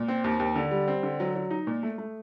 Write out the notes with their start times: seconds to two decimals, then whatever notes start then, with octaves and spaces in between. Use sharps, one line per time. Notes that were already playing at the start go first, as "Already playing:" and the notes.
Already playing: A#2
0.08 C4
0.24 D#2
0.40 D#2
0.56 D3
0.71 G3
0.88 C4
1.03 D3
1.20 F#3
1.36 F#3
1.51 D#4
1.67 A#2
1.83 A3
1.98 A3